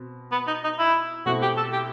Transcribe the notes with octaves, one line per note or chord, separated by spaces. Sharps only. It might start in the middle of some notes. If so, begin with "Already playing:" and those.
Already playing: B2 C4
B3
D#4
D#4
E4
B2 A3 C4 E4 F#4
G4
A4
G4